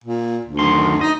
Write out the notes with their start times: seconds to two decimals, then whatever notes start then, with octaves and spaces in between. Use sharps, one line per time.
0.04 A#2
0.45 D2
0.59 F#2 D#3 C6
1.01 D#4 D#5